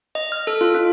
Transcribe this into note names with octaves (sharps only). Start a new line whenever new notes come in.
D#5
F6
A4
F4
F4